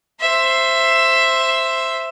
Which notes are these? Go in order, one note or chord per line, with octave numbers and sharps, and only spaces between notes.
C5 E5